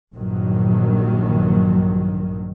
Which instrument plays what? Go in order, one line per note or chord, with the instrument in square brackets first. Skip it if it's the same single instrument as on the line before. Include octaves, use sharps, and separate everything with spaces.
[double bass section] A#1 G2 D#3 F#3